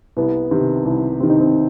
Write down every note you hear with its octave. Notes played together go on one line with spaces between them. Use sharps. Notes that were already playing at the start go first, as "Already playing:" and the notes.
C2 B3
C3 D#3
C2
C3 D#3 C4
D#4
C4